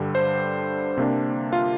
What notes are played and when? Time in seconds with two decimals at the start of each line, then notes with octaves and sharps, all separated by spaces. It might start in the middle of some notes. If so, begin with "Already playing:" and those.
Already playing: G2 D3 G3
0.15 C5
0.97 C3 A#3 D4
1.53 F4